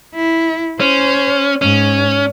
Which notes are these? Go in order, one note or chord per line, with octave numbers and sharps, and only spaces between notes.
E4
C#4 C5
G#2 C#4